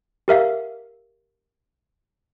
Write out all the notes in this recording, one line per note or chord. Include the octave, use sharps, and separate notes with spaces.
G4 A#4 E5 F5